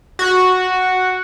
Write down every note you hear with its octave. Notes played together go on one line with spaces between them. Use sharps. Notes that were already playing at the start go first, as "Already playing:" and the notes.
F#4